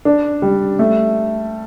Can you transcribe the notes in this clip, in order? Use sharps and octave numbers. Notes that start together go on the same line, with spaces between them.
D4
G3
A3